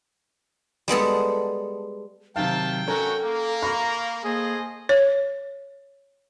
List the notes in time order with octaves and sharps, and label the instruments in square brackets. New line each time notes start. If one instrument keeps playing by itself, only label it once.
[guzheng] G3 G#3 B3 A4
[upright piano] C3 D#3 F5 [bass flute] F#3 [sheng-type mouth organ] G5 [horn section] A5
[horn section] F#3 A3 F#4 [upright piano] C#4 A#4 [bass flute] A4
[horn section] A#3
[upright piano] F5 B5 C#6 [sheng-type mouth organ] A#5
[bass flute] A#3 [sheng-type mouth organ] G#4 [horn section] A4 C5 D#5
[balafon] C#5